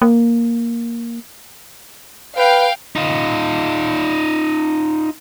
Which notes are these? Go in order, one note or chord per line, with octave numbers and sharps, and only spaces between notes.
A#3
B4 F5 G5
D#4 F4